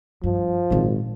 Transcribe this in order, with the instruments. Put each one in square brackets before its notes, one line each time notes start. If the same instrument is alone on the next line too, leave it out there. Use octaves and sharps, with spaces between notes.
[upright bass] G2 [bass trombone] F3
[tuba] G#1 [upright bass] A#2 G#3